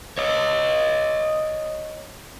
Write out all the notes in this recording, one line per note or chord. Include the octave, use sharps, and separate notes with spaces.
C#5 D#5